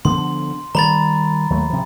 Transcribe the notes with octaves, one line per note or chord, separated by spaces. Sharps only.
D3 F3 B3 C6
D#3 G3 A#5 B5 A6
D#2 F#3 A3
C3 F3